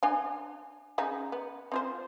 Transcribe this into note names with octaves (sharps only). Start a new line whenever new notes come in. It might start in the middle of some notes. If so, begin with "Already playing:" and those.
D4 G#5
C#3 D#4
B3
C4 F4 C5